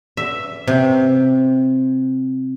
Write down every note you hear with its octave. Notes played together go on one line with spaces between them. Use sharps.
E5
C3